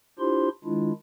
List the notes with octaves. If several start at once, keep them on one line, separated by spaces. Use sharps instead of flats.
D4 E4 F4 G4 C5 C6
D#3 G#3 D4 E4 F4